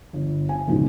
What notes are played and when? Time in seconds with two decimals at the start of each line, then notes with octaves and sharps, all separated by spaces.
0.13 G1
0.49 G#5
0.67 F#1 C#2 G#2 B2